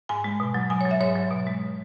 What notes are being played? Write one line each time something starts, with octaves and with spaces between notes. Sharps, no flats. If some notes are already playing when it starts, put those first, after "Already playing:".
G#2 G#5
G#3
B2
F#3
B2 G#5
C#5
F#3
E5
G#2 C#5
F#3
B2
G#3